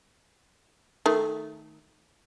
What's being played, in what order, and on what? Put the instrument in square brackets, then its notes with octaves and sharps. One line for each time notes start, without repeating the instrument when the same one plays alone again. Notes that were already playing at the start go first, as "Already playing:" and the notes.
[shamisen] D#3 A3